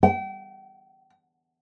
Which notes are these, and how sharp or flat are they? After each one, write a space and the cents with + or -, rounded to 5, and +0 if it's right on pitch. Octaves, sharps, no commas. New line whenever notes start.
G5 -35